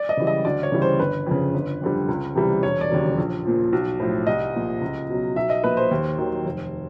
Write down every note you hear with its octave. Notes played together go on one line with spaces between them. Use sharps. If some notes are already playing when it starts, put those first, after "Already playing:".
Already playing: D5
D#5
C#3 E3 G3
D#5
D2 D5
C#5
C#3 E3 G3
C5
G1 B4
F2 C#3
G1
F2 D3 G3
C#2
C3 E3 G3
E1 C#5
D5
D#2 C#3 F#3
A#1
A#2 F3
B1
A2 F3
C2 D#5
A#2 F3
C#2
B2 F#3
B1 E5
D#5
A#2 F3 B4
C5
D#2
D#3 F#3
F1